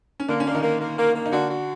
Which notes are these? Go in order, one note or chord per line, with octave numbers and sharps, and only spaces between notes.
C#4
D3 A#3 D4
C#4
A#3 D4
D#3 D#4
A#3
A#3
A#3
A#3
D#4
D3 D4 F#4
F#4